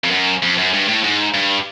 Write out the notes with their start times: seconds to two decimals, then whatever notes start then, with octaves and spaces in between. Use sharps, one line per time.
0.04 F2
0.11 F#2
0.43 F2
0.58 F#2
0.73 G2
0.88 A2
1.04 G#2
1.34 G2